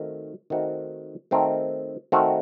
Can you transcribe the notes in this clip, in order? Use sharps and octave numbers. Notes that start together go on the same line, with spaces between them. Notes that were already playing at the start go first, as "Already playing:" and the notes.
Already playing: D#3 A3 C4 F#4 A#4
D#3 A3 C4 F#4 A#4
D#3 A3 C4 F#4 A#4
D#3 A3 C4 F#4 A#4